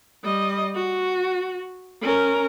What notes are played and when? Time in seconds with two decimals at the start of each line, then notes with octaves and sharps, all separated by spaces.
0.24 G3 D#5
0.75 F#4
2.02 C#4 A#4